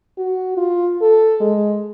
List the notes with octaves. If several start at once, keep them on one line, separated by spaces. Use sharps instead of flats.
F#4
F4
A4
G#3